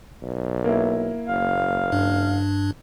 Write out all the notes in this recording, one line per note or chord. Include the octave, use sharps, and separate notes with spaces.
B1
A#3 E4
F#1 F5
G2 D4